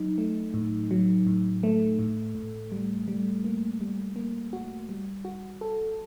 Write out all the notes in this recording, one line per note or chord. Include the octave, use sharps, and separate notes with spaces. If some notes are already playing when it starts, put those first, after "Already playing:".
Already playing: F#3 D#4
A3
A2
F#3
A2
A3
A2
A2
G3
G3
A#3
G3
A#3
F#4
G3
F#4
A4